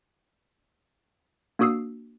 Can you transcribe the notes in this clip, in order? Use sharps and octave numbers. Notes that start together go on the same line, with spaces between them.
A#3 D4 F#4 D#6 E6 C7